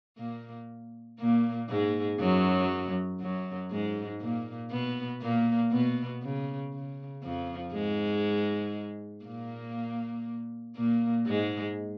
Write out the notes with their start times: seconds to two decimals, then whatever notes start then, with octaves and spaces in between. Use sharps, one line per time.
0.18 A#2 A#3
1.19 A#2 A#3
1.69 G#2 G#3
2.19 F#2 F#3
3.21 F#2 F#3
3.71 G#2 G#3
4.21 A#2 A#3
4.71 B2 B3
5.21 A#2 A#3
5.72 B2 B3
6.22 C#3
6.73 C#3
7.23 F2 F3
7.73 G#2 G#3
9.25 A#2 A#3
10.76 A#2 A#3
11.26 G#2 G#3